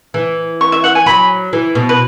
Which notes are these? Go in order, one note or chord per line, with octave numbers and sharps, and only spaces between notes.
E3
C#6
E5
F#5
G#5
F#3 B5
E3
B2
B4